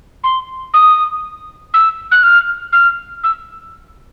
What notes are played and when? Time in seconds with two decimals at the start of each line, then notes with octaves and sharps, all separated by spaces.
0.24 C6
0.74 D#6
1.74 E6
2.11 F#6
2.23 F6
2.72 F6
3.24 E6